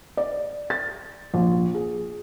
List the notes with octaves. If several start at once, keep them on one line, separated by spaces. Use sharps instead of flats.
D5
A6
A#1
G#4